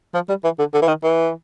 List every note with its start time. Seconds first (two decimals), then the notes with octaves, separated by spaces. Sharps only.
0.14 F3
0.29 G3
0.44 E3
0.59 D3
0.73 D3
0.82 E3
0.88 D#3
1.04 E3